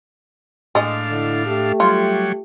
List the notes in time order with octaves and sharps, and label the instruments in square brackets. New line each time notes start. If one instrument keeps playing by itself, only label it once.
[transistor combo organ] A2 D4 F5 [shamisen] G#3 D#5
[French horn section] D3 E4
A3 G4
[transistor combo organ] F#3 G3 C#5 [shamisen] F4